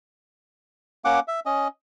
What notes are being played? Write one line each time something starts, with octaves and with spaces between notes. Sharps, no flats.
A#3 C#4 F#5 D6
E5
C#4 D#5